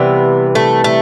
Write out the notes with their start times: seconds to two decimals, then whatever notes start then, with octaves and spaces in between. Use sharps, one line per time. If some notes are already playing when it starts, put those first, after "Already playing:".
Already playing: C3 E3 G3 B3
0.55 A3
0.84 A3